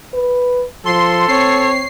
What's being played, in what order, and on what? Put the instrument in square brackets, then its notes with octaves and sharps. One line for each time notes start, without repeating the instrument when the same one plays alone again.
[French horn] B4
[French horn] F3 [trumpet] A4 [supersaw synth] C6
[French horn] C4 [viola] C#5 [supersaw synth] C7